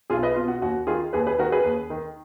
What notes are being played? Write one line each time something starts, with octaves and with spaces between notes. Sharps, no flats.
B1 F4 G#4
B4 D#5
B2 F4
F#4
D#2 F#4
D#3 F4 G#4
D#2 G#4 B4
G#4 B4
D#3 F#4 A#4
G#4 B4
D#2
D#3